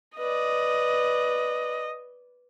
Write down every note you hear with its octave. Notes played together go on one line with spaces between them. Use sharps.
B4 D5 D#5